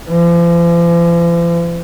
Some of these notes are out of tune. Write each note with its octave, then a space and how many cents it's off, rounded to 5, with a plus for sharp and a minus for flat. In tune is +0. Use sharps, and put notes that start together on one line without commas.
F3 -45